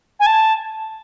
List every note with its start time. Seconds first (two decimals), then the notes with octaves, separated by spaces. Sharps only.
0.20 G#5
0.26 A5